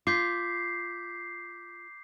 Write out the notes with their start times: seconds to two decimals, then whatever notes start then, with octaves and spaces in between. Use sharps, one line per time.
0.07 F4 D6 G6 B6 C7